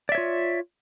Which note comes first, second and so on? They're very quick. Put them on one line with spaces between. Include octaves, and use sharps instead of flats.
D5 E5 C#5 F4